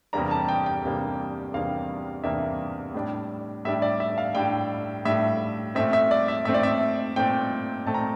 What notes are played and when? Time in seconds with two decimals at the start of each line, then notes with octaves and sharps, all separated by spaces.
0.13 E2 C3 G3 A#3 D4 A#5
0.31 A5
0.49 G5
0.66 G5
0.84 E2 C3 G3 A#3 D4
1.54 E2 C3 G3 A#3 D4 F5
2.24 E2 C3 G3 A#3 D4 E5
2.94 A2 G3 D4
3.65 A2 G3 D4 E5
3.82 D5
4.00 E5
4.18 F5
4.35 A2 G3 D4 G5
5.05 A2 G3 D4 E5
5.75 A#2 A3 C4 E5
5.93 E5
6.11 D5
6.28 E5
6.45 A#2 A3 C4 E5
6.54 D5
6.63 E5
7.16 A#2 A3 C4 G5
7.86 A#2 A3 C4 A5
7.94 A#5